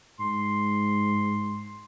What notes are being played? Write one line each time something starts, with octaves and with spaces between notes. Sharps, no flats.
G#2 C6